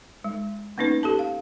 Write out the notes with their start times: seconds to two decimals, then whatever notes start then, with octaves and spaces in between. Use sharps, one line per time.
0.24 G#3
0.78 A#3 B3 C#4 D#4 B4
1.03 G4 A4 A5
1.19 F5